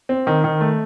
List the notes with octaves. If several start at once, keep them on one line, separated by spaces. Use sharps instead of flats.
C4
D#3
D#3
A3